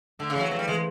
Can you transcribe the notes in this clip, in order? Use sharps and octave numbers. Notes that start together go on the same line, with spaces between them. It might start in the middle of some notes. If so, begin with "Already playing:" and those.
D3 A3
C#3
E3
F#3
F#3 C4
G3
E3 G#3